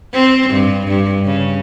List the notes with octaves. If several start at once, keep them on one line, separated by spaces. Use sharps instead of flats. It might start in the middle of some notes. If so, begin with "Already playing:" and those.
C4
G2
G2
C#3